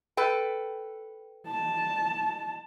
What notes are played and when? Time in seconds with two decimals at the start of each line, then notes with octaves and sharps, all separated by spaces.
0.17 A4 B4 G5
1.47 A5